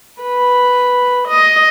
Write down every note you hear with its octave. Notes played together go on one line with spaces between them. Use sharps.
B4
D#5